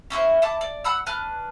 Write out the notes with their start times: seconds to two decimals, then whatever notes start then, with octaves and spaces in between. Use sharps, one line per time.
0.10 C#4 E4 F#4 C5
0.42 E4 A5 D6
0.61 D5
0.84 F#5 B5 E6 F#6
1.06 D4 B4 F6 F#6